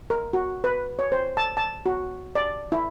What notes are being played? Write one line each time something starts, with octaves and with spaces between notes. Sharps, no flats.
A#4
F#4
B4
C#5
C5
A5
A5
F#4
D5
E4